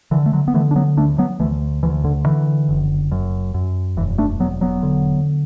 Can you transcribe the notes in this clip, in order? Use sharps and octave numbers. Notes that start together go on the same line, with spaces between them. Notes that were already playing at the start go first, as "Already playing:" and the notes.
D3 E3
A3
D3 F#3
B3
D3 E3 A3
D4
F#3 B3
D2 A3 D4
F#3 B3
D2 E3 A3
D2 E3
D3
D3 E3
F#1
F#2
F#2
E1 E3
A3 D4
E1 F#3 B3
F#3 B3
D3